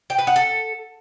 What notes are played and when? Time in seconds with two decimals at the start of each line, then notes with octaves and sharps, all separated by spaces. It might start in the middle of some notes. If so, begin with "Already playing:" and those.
0.10 G5
0.19 B4
0.27 F#5
0.36 A4